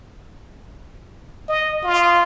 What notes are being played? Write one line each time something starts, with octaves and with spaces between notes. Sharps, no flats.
D#5
F4